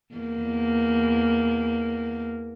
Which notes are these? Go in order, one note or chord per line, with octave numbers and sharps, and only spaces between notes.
E2 A#3